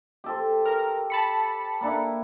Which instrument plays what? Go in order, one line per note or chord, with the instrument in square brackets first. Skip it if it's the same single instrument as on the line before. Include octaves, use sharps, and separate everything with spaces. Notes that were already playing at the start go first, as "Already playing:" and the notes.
[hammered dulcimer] G4 A4 C5
[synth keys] A#4
A5 B5 C#7
[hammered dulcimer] A#3 D4 E4